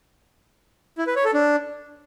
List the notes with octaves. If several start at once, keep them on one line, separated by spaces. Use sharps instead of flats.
E4
B4
C#5
A4
D4